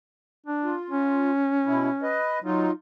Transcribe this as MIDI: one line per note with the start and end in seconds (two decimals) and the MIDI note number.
0.46 0.73 62
0.64 1.30 65
0.90 2.18 61
1.66 1.89 47
1.66 1.89 64
2.03 2.39 71
2.03 2.39 75
2.44 2.69 54
2.44 2.71 63
2.44 2.71 65